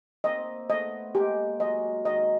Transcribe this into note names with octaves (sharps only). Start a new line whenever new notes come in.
A#3 C4 D#5
A3 B3 D#5
G#3 A#3 G4
F#3 G#3 D#5
D#3 D#5